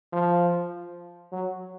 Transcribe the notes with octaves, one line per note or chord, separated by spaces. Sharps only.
F3
F#3